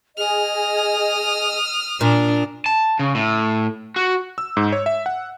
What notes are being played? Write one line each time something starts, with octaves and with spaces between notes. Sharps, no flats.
G#4 D#5 D#6 F6
A#2 D4
A5
C#3
A2
F#4
E6
G#2
C#5
E5
F#5